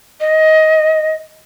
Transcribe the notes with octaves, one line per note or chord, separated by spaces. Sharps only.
D#5